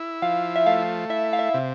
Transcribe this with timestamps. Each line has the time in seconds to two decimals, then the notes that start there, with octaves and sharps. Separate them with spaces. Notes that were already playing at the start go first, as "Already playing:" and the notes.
Already playing: E4
0.22 F3 F5
0.56 E5
0.66 A3 F5
1.09 E4 E5
1.33 F5
1.39 E5
1.54 C3